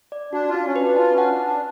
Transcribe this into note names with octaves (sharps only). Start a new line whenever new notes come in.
D5
D4 F#4
F4
F#4
C#4
B4
D4
F4 A5
C#4
F#5
D4
A5
D4